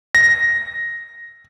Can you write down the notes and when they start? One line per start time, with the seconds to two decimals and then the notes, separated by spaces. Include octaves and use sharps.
0.15 A#6